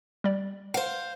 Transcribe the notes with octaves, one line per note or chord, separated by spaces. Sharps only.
G3 D5
C5 F5 F#5